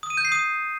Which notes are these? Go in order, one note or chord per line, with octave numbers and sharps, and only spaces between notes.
D#6
D#7
G6
C7
D#6